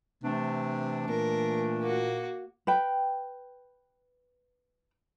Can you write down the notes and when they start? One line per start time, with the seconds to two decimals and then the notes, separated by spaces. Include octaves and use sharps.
0.23 C3 E3 A3 D4
1.08 A#2 A#4
1.82 A#3 F#4
2.67 B4 G5